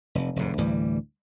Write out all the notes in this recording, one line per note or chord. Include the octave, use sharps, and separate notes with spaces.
F1
F1 D#2 G#2
D2 A2 E3 G3